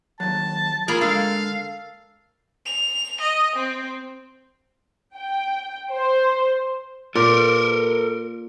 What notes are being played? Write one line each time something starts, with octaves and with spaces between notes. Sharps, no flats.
D#2 F#3 A5
A#3 F4 G#4 B5
D3 G#3 A4 F5
F7
D#5
C4
G5
C5
A#2 A4 A#4